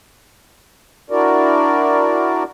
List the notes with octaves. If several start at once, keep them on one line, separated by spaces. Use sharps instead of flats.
D4 E4 F#4 A#4 D5